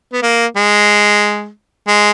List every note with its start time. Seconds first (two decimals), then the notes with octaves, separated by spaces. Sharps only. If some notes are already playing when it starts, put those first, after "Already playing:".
0.13 B3
0.23 A#3
0.56 G#3
1.88 G#3